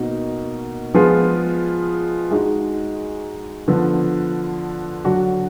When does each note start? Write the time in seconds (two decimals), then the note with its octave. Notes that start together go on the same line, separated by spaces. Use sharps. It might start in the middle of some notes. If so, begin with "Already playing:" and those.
Already playing: B2 A#3 D#4 F#4
0.94 F3 G#3 B3 F4 G#4
2.31 G#3 D#4 F#4
3.68 D3 F3 B3
5.05 D3 F#3 D4 F#4